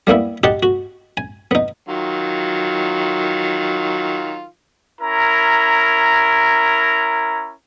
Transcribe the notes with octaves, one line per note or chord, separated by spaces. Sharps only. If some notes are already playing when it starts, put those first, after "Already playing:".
G3 A#3 B3 E4
D#4 G4 F#5 A5 C6
F#4
G#5
B3 D#4
D#3 F#3 F4
C#4 E4 A#4 A#5